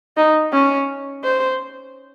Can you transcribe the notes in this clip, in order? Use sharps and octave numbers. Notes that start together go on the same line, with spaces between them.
D#4
C#4
C5